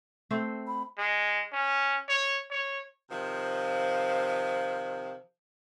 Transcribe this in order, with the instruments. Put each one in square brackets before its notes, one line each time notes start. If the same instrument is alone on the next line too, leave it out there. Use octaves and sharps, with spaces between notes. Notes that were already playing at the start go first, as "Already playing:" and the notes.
[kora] A3 C4 C5
[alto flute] B5
[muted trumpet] G#3
C#4
C#5
C#5
[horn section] C3 D#3 F3